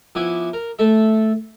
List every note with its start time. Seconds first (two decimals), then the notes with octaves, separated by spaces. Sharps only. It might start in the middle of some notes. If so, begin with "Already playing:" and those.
0.15 F3 B3 E4 G#5 D6
0.53 A#4
0.79 A3 A4 E5